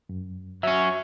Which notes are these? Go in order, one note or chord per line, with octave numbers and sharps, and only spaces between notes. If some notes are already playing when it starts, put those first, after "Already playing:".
F#2
F#3 C#4 E5